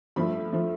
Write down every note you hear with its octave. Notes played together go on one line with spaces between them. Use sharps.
G2 F3 A3 B5
F3 A3